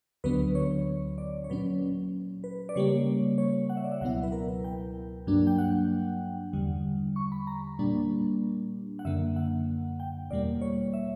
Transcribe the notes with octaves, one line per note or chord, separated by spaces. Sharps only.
D2 D3 F#3 B3 B4
C#5
D5
C#5
A#2 F#3 C#4 B4
B4
D5
C#3 G3 A#3 C#5
C#5
F#5
E5
D5
E5
C#2 B2 F#3 B3 E4 F#5
B4
A#4
B4
G5
G2 F#3 A#3 D4
G5
F#5
E2 D3 G3
C#6
B5
A#5
A#2 G3 A#3 D4
F#5
F#2 D3 A#3 E5
F#5
G5
E2 B2 G3 A#3 D5
C#5
E5